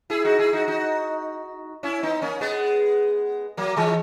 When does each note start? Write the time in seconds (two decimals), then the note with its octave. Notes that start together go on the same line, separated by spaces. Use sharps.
0.10 E4 G#4
0.25 D#4 F#4
0.39 E4 G#4
0.53 D#4 F#4
0.68 D#4 F#4
1.83 C#4 E4
2.03 B3 D#4
2.22 A#3 C#4
2.41 G#3 B3
3.57 F#3 A#3
3.77 E3 G#3